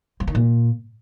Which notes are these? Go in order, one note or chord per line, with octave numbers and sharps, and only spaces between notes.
F3
D#3
A#2